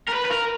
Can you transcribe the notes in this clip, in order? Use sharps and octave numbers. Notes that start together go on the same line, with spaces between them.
A#4
B4
B4
A#4